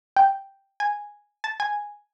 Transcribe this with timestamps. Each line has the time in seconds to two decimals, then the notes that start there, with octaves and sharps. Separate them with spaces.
0.16 G5
0.80 G#5
1.44 A5
1.60 G#5